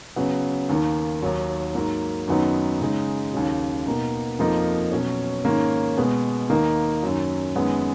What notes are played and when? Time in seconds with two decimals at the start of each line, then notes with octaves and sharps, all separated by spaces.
0.16 C#3 F#3 B3
0.69 D#2 D#3 A#3
1.22 D#2 D#3 F#3
1.75 G#2 F#3 A#3
2.28 F#2 D#3 F#3 B3 D#4
2.81 C#3 G#3 D#4
3.33 D#2 C#3 F#3
3.86 B2 A#3 D#4
4.39 F2 F3 A#3 D#4
4.91 B2 F#3 C#4
5.45 G#2 D#3 A#3 C#4
5.97 B2 G#3 B3
6.50 D#2 D#3 A#3 D#4
7.03 F#2 D#3 F#3
7.56 F#2 D#3 G#3 B3